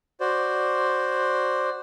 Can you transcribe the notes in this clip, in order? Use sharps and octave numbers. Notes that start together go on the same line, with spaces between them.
F#4 C5 D5